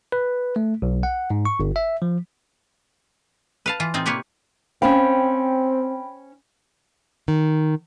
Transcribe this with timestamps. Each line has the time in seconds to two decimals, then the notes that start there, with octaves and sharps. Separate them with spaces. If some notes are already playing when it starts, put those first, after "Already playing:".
0.12 B4
0.56 A3
0.82 B1
1.03 F#5
1.30 G#2
1.45 C#6
1.60 G1
1.76 E5
2.02 F3
3.66 B4 F5 A5
3.80 E3 F4
3.94 A2 C4 D#4 F4
4.06 C3 A#3 G4 B4 C#5
4.82 C4 C#4 C5 F5 G5 B5
7.28 D#3